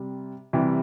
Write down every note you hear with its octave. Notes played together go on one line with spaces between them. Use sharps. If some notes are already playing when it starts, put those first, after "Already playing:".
Already playing: C3 G3
C3 E3 G3